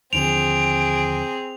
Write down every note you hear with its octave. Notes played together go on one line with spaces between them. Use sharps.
D#2 D3 F3 C4 G#4 D7 F7